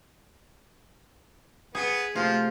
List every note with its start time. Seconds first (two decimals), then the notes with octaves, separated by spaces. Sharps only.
1.75 B3 G#4
2.16 C3 F3 A3 F4